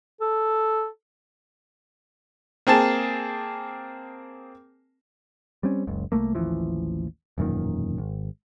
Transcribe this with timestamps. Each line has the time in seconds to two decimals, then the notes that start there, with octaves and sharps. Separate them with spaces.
0.21 A4
2.67 A#3 C4 G#4 A5
5.63 G3 C4 C#4
5.87 F#1 C#2
6.12 C2 F#2 A3 A#3
6.35 A1 D#2 E3 F3
7.38 E1 F#2 A#2 D#3
7.98 G#1